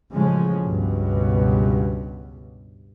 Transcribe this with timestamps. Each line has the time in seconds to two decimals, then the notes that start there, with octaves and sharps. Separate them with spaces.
0.12 A1 C#3 F3 G#3 C#4
0.62 C#2 G2 B2